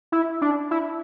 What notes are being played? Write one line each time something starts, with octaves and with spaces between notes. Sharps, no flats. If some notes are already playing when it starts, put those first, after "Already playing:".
E4
D4
E4